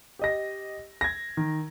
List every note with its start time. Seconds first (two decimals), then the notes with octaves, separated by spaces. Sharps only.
0.19 G4 D#5 A#6
1.01 G#6 A#6
1.37 D#3